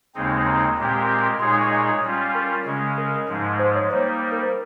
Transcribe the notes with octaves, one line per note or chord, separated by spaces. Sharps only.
D#2 C#3 G#3 C4 D#4
A#5
A#2 G#3 C4 G4 A#4
A#2 G#3 D#4 G#4 C#5 C6
D#6
C#6
D#5
G3 C#4 F4
A#4
C#3 G#3 C#4
A#4
G#2 F3 G#3
C5
C#5
G3 A#3 D#4 C5
A#4
C5